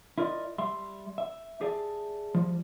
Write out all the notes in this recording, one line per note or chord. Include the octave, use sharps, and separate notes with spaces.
E4 F4 A#4 D5 D#5
G3 E5 C6
E5
G4 G#4 D5 E5 A5
F3 G3